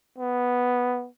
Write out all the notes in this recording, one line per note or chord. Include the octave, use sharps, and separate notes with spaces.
B3